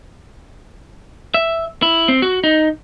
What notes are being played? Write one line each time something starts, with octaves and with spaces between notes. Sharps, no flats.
E5
E4
C4
F#4
D#4